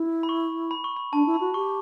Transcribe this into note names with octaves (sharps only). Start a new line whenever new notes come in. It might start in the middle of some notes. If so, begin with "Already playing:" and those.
Already playing: E4
B5
C#6
B5
C#6
B5
D4 A5
E4
B5
F#4
G4 C#6